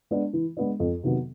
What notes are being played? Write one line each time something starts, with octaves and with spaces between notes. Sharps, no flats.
G#3 B3 D4
E3
G#3 B3 D4
F2
C3 D#3 F#3 B3